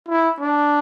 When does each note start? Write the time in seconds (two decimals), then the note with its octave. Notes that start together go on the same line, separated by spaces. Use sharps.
0.08 E4
0.40 D4